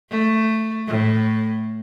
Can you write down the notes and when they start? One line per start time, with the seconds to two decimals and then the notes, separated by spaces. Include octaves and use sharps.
0.10 A3
0.87 A2